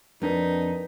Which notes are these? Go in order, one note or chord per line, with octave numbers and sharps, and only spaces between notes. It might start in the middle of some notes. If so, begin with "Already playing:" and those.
F2 C4 D4 D#4 A#4 B4 B6